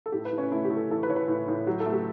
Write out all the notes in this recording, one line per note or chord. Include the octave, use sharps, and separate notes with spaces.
A4
A2 G4
B4
A2
C#4
A3 E4
G4
A3
A4
E3 A4
B4
E3 C#5
B4
A2
A2
F#3 G4
A4
A3
G4